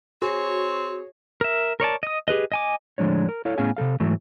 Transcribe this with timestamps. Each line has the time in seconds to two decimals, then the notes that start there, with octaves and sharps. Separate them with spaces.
0.22 C4 F#4 G#4 C#5
1.41 A#4 E5
1.80 A#4 C#5 D5 A5
2.03 D#5 D#6
2.28 G4 G#4 B4 D#5
2.52 D#5 G#5 D6
2.98 A2 D3 F3 G#3 D4 C#5
3.29 A#4
3.45 E4 A4 C#5 F5
3.58 A2 B3 C#4 G#4 F5 G#5
3.77 C3 G3 A4 F5
4.00 G#2 E3 F#3 A3